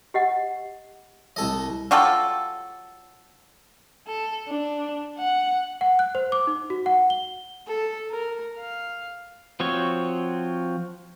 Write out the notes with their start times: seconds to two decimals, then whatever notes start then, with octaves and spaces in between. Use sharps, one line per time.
0.14 G4 D#5 F#5
1.36 C2 A4 D#5
1.91 F#3 F4 G4 A4
4.07 A4
4.47 D4
5.18 F#5
5.81 F#5
5.99 F#6
6.15 C5
6.32 D6
6.47 D#4
6.70 F#4
6.86 F#5
7.10 G7
7.67 A4
8.11 A#4
8.57 F5
9.60 F3 C4 F#4 C#5